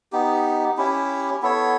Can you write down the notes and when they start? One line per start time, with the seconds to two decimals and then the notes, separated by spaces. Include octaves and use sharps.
0.12 B3 D#4 G4
0.77 C#4 E4 G4
1.42 B3 E4 A4 C#5